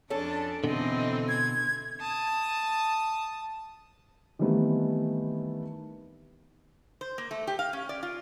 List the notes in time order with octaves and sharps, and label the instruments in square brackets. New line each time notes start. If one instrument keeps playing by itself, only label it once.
[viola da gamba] F2 D4 [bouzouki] C#4 A4 [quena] A5
[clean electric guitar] B2 D3 [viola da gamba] E3 C4 [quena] D#5
[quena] G#6
[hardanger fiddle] A5 D#6
[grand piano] D#3 E3 G3 A3 B3 C4
[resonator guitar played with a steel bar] C5
A#3
A3
G4
F5
C#4
D5
F4